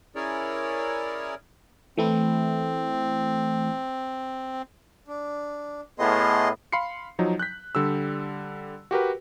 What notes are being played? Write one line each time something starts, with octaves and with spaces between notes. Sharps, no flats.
C#4 E4 G#4 A#4 C#5 D5
E3 A3 C4 E4
D4
A2 B3 G#4 D#5 C6
F5 B5 C6 C7 C#7
F3 F#3 D#4
F#6 G6 B6
D3 G3 E6
F#4 G4 A#4 B4